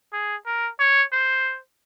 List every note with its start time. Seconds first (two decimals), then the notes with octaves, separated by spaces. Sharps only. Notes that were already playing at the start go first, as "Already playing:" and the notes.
0.13 G#4
0.46 A#4
0.79 C#5
1.12 C5